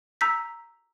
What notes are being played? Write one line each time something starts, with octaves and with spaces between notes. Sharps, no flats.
A#5 E6 G6 B6